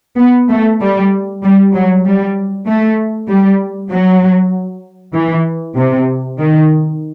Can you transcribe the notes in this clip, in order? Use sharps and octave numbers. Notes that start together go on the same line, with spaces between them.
B3
A3
G3
G3
F#3
G3
A3
G3
F#3
E3
C3
D#3